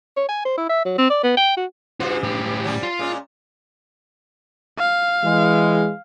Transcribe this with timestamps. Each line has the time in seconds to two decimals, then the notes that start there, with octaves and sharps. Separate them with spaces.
0.17 C#5
0.29 G#5
0.45 C5
0.57 E4
0.69 E5
0.85 F#3
0.98 C4
1.10 D5
1.23 B3
1.37 G5
1.57 F#4
2.00 G2 C#3 F4 F#4 C5
2.23 A2 G4
2.64 F#3 G3 C#4
2.83 F4
2.99 A#2 G#3 C#4
4.79 F5
5.24 E3 G#3